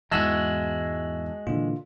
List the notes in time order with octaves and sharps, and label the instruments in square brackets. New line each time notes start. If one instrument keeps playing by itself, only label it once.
[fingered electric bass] E2 G#2 E3 [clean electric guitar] G#3 F#4 [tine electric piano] E5 A5 E6
[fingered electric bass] A#2 D3 E3 [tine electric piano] F4